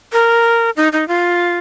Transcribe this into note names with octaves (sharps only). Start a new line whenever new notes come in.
A#4
D#4
D#4
F4